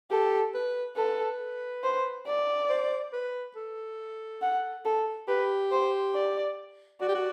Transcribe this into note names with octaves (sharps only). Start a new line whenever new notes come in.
G4 A4
B4
A4 B4
C5
D5
C5
B4
A4
F#5
A4
G4 B4
C5
D5
F#4 D5
G4
F#4